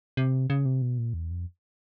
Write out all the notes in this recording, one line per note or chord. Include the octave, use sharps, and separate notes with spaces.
C3
C#3
C3
B2
A#2
E2
F2